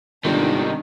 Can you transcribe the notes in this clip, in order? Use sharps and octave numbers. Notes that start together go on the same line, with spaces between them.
G1 G#2 C3 D#3 D4